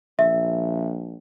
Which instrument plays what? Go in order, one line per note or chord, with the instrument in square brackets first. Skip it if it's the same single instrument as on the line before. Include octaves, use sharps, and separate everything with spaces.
[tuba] A#1 [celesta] E5